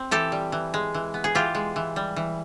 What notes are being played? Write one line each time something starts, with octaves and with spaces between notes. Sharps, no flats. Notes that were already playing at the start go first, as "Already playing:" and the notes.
Already playing: C4
E3 G4 A4
G3
E3
G#3
E3
B3
G#4
E3 F4 G4
G#3
E3
G3
E3